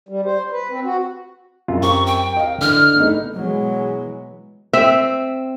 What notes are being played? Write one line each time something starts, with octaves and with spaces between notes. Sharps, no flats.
G3
C5
B4
C4
F#4
F#2 F4
C4 G4 A#4 C#6
G5
D#5 F5
D3 E3 F6
A3 B3 D#4
B2 E3 F#3 G#3 B3
C4 E5